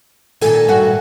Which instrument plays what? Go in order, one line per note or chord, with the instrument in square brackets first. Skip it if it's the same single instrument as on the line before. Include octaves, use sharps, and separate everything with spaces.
[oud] A#2 D#3 [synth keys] A4 G#5
[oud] G2 A3 F#4